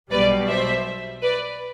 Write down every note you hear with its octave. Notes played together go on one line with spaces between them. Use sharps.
B1 B2 G3 B4 D5
C5 E5
B4 D5